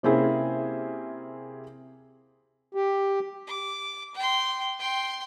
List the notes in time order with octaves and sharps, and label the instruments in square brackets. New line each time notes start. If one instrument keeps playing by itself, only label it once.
[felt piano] C3 A#3 C4 C#4 E4 G#4
[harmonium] G4
[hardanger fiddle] D6
G5 C6
G5 C6